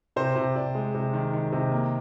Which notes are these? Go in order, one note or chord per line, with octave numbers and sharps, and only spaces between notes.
C3 C5
C3
C3 D5
G#3
C3
D#3
D#3
C3
A#3